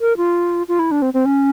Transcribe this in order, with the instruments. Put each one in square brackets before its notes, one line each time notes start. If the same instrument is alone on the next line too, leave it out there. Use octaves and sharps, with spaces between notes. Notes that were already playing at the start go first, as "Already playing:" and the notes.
[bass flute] A#4
F4
F4
E4
D4
C4
C4
C#4